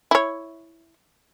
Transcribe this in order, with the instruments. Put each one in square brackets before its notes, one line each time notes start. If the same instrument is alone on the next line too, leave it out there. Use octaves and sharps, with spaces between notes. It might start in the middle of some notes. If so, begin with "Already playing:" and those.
[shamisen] E4 C#5